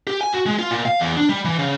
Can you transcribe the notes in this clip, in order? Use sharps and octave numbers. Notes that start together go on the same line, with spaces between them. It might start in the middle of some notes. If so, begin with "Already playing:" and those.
G4
G#5
F#4
G#3
F4
A#2
F5
E2
D4
G3
E3
C#3